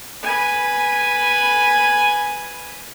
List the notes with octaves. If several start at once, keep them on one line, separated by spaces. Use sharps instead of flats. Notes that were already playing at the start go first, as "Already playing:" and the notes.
B4 G#5